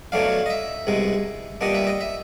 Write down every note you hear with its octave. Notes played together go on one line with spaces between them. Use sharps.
B2 F#3 A3 D4 F5
D#5
E5
C2 B2 G#3
A#2 G3 B3 D4 D#5
E5
D#5
E5